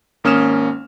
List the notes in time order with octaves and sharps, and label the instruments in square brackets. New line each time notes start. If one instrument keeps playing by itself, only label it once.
[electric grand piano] G#1 A#3 C#4 D#6 F6 E7